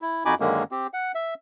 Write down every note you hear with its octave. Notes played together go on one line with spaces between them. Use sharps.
E4
F2 D#4 F#4 G#5 B5 D6
F#2 D3 D#3 G#3 A#3 C#4
C4 G4
F#5
E5